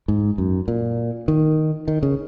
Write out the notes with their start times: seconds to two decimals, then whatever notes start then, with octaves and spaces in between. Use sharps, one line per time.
0.08 G#2
0.38 F#2
0.68 A#2
1.28 D#3
1.88 D#3
2.03 C#3